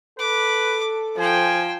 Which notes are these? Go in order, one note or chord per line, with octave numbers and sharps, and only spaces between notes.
A4 B4 D6
F3 C5 G5 G#5